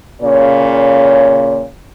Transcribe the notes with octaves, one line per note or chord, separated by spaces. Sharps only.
A#2 C#3 C#5